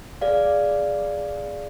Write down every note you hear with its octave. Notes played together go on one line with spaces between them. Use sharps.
G#4 D5 F5